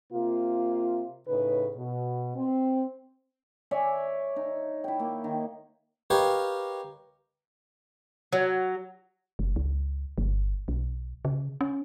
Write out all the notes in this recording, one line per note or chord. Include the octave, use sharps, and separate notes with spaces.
C3 A#3 F4
A2 C#3 D#4 B4
B2
C4
C#5 D5 E5 G#5
D#4
E4 G5
A#3
D#3
G4 A#4 B4 C#5 D#5 F5
F#3
F#1
C#2
G1
B1
C#3
C#4